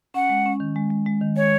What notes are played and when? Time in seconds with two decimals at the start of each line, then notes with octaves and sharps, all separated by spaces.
0.14 C#4 F#5
0.29 G#3
0.46 C#4
0.60 D#3
0.76 G#3
0.90 G#3
1.06 G#3
1.21 D#3
1.36 G#3 C#5